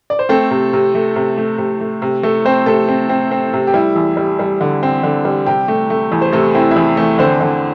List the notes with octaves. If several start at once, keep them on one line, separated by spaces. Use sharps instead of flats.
D5
C5
A3 C4 A4
C3
C3
A3
C3
A3
C3
A3
C3
A3 A4
A3 C4 C5
C3 A3 A4
C4
C4
C4
C3
G4
G3 E4
E2
G3
G3
D3
C4
D3
G3
C3 G4
A3
A3
E2
C5
C3 A3 A4
C4 E4
E4
E2 G4
E2 A3 A4
D3 C4 C5
D3